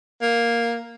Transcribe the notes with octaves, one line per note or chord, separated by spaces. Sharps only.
A#3